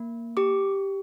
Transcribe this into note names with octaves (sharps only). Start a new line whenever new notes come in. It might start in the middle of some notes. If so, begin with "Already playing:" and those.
Already playing: A#3
G4 D6